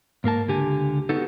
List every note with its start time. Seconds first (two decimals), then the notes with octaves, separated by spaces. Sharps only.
0.24 G#2 A#3 A#4 A5
0.48 C#2 D3 G4 G#5
1.09 B3 D#4 F#4 G4 A4